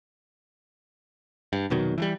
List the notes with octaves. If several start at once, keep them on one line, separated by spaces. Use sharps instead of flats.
G2
F1 B2 D#3 F#3
E3 F3 G3